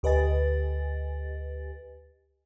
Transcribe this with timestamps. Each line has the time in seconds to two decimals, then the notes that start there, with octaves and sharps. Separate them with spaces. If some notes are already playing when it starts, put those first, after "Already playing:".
0.03 D2 G4 B4 D#5 G#5 A6